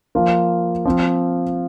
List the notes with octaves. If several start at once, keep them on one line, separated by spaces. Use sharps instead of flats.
F3 A#3 F4
F3 C4 F4